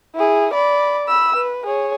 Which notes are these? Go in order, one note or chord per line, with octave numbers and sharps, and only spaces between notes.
E4 G#4
D5 B5
B5 E6
B4
G#4 C#5